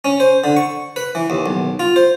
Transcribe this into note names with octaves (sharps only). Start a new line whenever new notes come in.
C#4
C5
D3
C#6
B4
E3
D#2
B1
F4
C5